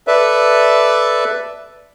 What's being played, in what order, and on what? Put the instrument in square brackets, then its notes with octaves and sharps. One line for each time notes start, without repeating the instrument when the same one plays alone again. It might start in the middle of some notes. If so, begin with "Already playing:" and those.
[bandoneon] A4 B4 D5 E5